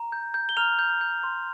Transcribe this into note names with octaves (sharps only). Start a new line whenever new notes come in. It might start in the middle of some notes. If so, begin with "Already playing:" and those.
Already playing: A#5
G6
G6
G7
A#5 F6 F7
G6
G6
C6